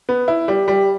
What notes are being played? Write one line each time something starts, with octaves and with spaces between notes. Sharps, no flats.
B3
E4
G3
G3